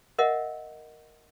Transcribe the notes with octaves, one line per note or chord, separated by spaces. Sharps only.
A#4 D#5 E5 F#5